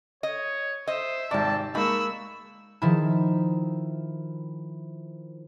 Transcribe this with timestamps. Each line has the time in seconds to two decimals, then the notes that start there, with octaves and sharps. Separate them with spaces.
0.23 C#5 D#5
0.88 C5 D#5 E5
1.31 G#1 C3 G4 D5 A5
1.75 G#3 A#3 D#4 B5 C#6 E6
2.82 D#3 F3 E4